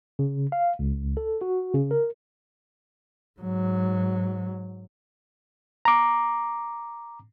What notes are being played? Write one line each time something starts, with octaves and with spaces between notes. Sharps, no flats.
C#3
F5
C#2
A4
F#4
C#3
A#4
G#2 F#3
A#5 D6